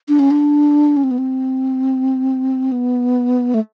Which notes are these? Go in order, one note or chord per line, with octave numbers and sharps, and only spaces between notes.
D4
C#4
D4
C#4
C4
B3
C4
B3
A3